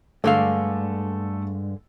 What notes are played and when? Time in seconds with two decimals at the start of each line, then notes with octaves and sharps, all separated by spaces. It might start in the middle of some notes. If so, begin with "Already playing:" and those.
0.24 G2 D3 G#3 A3 A4 F5